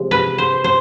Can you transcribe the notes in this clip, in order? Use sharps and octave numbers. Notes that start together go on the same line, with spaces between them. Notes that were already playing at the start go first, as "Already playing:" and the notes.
Already playing: C3 F3 G#3
B4
C5
C5